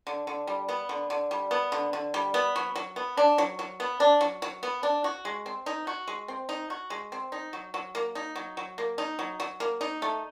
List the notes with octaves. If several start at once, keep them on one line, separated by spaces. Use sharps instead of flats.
D3
D3
G3
B3
D3
D3
G3
B3
D3
D3
G3
B3
F#3
F#3
B3
D4
F#3
F#3
B3
D4
F#3
F#3
B3
D4
F#4
G#3
C4
D#4
F#4
G#3
C4
D#4
F#4
G#3
C4
D#4
F#3
F#3
A#3
D#4
F#3
F#3
A#3
D#4
F#3
F#3
A#3
D#4
A3